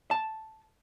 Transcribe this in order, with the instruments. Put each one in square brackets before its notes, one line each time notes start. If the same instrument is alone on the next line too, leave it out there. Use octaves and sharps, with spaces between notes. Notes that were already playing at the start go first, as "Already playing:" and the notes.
[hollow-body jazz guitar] A5